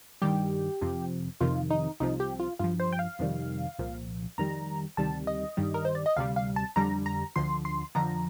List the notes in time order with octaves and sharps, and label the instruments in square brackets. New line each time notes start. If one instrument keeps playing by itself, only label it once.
[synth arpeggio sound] G2 D#3 G3 G4
F2 C3 F3
F2 C3 D#3 F4
D#4
C2 C3 F3 D#4
G4
F4
G2 F3 F4
C5
G5
F5
F2 C3 D#3 G3
C2 A#2 F3
F2 D#3 G3 A#5
D2 C3 D#3 G3 A5
D#5
G2 D#3 G3
A#4
C5
D5
D#5
D2 C3 G3 F5
F5
A5
F2 D3 G3 A#5
A#5
D2 D3 F3 C6
C6
F2 D3 F3 A#5